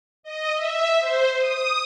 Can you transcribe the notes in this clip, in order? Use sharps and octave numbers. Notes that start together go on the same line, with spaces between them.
D#5
E5
C5
D#6